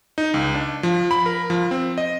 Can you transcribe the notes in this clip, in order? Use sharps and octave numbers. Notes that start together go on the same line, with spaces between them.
D#4
C#2
D4
F3
B5
A#4
F3
C4
D#5